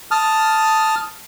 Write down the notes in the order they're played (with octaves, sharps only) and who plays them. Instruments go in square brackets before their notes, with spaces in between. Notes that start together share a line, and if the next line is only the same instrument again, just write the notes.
[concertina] A5 D#6 F6